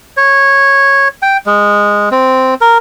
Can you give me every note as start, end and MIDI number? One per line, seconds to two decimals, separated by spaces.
0.17 1.08 73
1.22 1.37 79
1.46 2.09 56
2.11 2.54 60
2.61 2.78 70